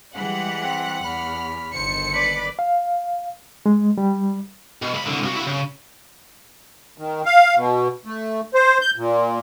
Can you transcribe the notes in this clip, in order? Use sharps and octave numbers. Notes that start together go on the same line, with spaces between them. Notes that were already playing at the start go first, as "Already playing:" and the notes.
E3 G3 G#3 G4 F#5
C4 F#6
E2 B5 F6
G1 D#3 A4 C5 C#7
B4 D5
F5
G#3
G3
B2
C#2 B5
C2 D3
C2 F#4
E4 F#4
C#3
D#3
F5
B2
A3
C5
G6
A#2